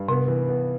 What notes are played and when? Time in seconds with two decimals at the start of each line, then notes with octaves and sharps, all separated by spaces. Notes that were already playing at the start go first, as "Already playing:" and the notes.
Already playing: G2
0.09 C3 B3
0.28 E3
0.48 B3